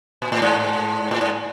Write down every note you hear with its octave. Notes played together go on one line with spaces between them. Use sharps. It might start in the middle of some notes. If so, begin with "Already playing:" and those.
A#2
A2
G#2
A2
G#2